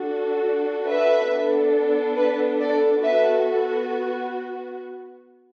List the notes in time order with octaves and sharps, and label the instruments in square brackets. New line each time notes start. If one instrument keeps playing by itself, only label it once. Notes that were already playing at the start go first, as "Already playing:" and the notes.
Already playing: [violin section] D4 F#4 A4
B4 E5
B3 D4 A4
B4
A4 D5
B3 F#4 A4 B4 E5